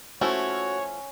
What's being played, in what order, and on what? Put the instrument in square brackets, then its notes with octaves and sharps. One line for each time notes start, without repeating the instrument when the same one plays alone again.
[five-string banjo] F3 A3 E4 [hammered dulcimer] C#4 [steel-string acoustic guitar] F#4 [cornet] C#5